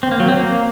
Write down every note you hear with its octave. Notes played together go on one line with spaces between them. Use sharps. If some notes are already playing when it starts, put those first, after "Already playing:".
C4
A#3
F#3
C4
A#3